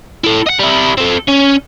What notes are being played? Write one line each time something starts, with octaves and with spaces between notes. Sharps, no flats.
E4 A4
D#5 F#5
G3 E4
C4 A4
C#4